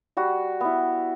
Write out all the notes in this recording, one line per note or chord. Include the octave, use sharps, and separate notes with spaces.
G3 F#4
B3 E4